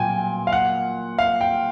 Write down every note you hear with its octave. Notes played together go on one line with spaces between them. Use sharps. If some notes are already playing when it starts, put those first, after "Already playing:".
Already playing: A#2 F#3 G5 G#5
F5
F#5
F5
G5